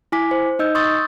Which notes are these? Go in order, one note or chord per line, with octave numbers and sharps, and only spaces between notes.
E4 G#5 D6 B6
C5
D#4 D#5 E6 G6
C6 C#6 D#6 E6 G6 A6